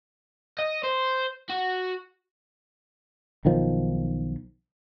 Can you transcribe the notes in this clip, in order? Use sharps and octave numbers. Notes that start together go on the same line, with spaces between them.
D#5
C5
F#4
B1 D#3 F3